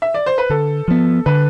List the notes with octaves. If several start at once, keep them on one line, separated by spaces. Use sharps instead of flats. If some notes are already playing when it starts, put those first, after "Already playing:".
E5
D5
C5
B4
D3 A4
F3 B3
D3 B4